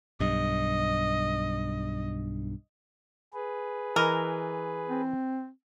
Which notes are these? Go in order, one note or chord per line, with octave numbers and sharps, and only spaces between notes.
B1 G2 D#5
G#4 B4
E3 A#4 D#5
C4